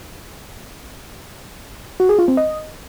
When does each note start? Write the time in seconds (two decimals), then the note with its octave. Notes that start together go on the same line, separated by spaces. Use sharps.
2.00 F#4
2.09 G#4
2.19 F4
2.28 C4
2.37 D#5